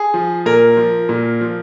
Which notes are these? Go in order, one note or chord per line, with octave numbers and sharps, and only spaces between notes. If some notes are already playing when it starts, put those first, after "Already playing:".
Already playing: G#4
F3
A#2 A#4
F3
A#2
F3